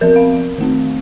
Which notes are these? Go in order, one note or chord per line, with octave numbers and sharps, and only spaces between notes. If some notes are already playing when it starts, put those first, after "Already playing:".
F3 C4 A#4
F5
D#3 A3 C4